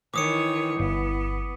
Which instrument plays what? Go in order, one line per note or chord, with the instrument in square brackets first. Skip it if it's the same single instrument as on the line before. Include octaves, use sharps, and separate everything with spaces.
[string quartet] D#3 C#5 [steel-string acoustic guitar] E3 [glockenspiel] D6 D#6 C#7
[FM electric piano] G1 [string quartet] B3